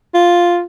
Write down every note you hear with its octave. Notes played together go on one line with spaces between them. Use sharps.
F4